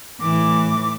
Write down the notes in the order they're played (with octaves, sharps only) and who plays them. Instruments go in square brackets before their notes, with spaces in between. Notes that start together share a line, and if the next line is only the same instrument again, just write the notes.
[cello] A2 E3 [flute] D6